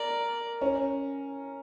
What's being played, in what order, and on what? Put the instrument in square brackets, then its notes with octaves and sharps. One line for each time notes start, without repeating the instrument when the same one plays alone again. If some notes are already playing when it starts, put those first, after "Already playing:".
Already playing: [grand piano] A#4 [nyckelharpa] D5
[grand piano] C#4